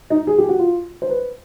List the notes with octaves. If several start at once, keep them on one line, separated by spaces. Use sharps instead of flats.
D#4
G#4
G4
F#4
F4
C5
B4